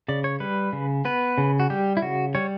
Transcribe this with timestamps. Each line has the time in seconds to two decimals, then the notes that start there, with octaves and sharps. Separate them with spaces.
0.08 C#3 D5
0.24 C#5
0.40 G3 B4
0.73 C#3
1.05 B3 B4
1.38 C#3
1.60 F#4
1.70 G3 G4
1.97 E4
2.02 C#3 F#4
2.35 G3 C#5